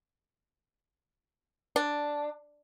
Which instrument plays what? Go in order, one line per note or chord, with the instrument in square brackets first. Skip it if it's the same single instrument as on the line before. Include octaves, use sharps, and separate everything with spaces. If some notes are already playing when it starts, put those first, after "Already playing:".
[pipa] D4